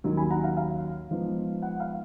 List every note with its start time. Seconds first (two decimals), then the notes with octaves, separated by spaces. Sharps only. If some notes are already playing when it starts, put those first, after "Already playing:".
0.04 D#2 D#3 F#3 A#3 C#4
0.17 G#5 B5
0.31 F#5 A#5
0.44 F5
0.57 F5
1.10 G#2 F3 B3
1.62 F#5
1.80 F5